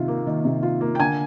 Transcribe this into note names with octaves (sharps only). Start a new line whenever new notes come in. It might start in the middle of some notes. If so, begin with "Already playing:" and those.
Already playing: C3 D#3 F4
A#3
D#3
C3
F4
A#3
G5
D3 G#5